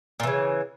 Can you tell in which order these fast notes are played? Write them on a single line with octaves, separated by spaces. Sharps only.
A#2 E3 C#3